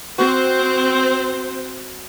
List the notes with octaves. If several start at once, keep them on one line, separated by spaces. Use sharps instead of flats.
C4 F#4 C5